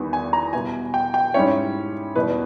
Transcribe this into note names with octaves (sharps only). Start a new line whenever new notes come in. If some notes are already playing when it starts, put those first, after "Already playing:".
Already playing: E2 D#3 G3 B3
G#5
A#5
B2 G3 B3 E4 G#5
G5
G5
G#2 G3 C#4 E4 C#5
E2 B2 G3 B3 D#4 B4